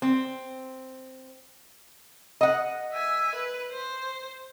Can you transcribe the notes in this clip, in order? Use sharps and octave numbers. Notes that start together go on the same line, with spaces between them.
C4
D#5 F#5
E5 G#5
B4
C5